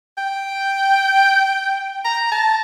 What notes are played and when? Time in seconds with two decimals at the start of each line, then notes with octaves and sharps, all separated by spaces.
0.18 G5
2.05 A#5
2.32 A5